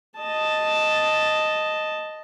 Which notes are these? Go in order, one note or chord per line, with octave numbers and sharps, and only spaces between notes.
D#5 A5